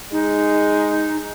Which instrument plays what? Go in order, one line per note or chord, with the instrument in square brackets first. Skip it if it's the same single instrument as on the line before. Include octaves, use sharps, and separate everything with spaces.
[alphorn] G#3 [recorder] D#4